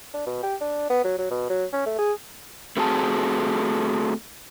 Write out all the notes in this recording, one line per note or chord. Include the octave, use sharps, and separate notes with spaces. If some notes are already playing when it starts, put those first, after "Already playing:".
D4
B2
G4
D4
B3
F#3
F#3
B2
F#3
C#4
A3
G#4
A3 C4 F#4 G#4 F#5 A5